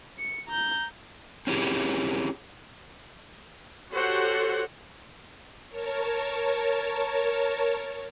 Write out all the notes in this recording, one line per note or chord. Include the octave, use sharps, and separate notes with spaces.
C#7
A#5 G6
C4 C#4 E4 G4 G#4
F#4 G4 A4 C5 C#5 F#5
A#4 C#5 A5